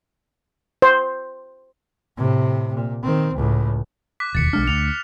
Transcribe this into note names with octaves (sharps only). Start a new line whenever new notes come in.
C5
A2 C3
A#2
D#3 C4
C#2 A2
D6 F#6 B6
E1 D#2 A6 C#7
B1 G#3 D4 F6
D2 F7